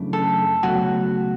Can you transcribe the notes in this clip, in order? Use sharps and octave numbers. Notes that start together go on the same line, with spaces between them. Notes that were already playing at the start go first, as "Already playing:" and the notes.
Already playing: F#2 C#3 E3 A3 D4
A4
C#2 B2 F#3 A3 F#4